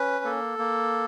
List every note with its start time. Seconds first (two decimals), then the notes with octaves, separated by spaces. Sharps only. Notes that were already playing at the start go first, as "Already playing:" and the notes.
Already playing: C#4 B4
0.24 A#3 A4
0.59 A#3